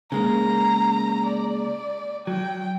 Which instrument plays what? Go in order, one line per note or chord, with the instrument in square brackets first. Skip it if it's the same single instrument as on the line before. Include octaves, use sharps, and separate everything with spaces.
[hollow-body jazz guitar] C#3 G#3 A#3 [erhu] A#5
[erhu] D5
[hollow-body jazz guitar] F#3 [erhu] G5